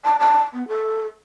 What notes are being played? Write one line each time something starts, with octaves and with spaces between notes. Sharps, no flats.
A5
A5
B3
A4